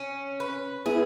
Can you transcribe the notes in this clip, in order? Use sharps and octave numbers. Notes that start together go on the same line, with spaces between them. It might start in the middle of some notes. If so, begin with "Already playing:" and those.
Already playing: C#4
B4
B3 E4 G#4